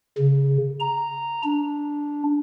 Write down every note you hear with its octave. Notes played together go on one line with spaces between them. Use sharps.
C#3
A#5
D4